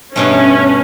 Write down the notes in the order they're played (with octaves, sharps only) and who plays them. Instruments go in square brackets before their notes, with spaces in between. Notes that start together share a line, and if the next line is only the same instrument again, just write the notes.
[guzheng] G2 B2 A3 [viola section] C#4